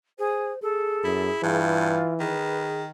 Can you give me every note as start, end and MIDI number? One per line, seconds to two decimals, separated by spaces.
0.19 0.52 68
0.19 0.62 72
0.62 1.61 68
0.62 1.25 69
1.04 1.30 42
1.04 1.41 64
1.43 1.98 43
1.43 2.33 52
1.43 2.14 65
2.20 2.90 51
2.20 2.82 68
2.20 2.65 71